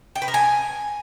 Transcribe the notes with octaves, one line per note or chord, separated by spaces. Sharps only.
G5
B4
A#4
G#5